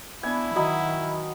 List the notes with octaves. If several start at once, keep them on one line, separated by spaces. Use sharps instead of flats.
B3 D4 E4 G#5
D#3 F#3 D#5 B5